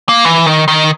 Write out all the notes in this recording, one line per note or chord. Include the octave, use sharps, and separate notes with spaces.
A#3
E3
D#3
D#3